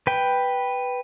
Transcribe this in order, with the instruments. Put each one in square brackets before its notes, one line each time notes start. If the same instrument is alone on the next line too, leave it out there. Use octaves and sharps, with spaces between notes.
[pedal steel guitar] B4 G5